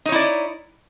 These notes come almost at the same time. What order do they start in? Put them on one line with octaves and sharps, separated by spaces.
D#4 C#5 E4 D5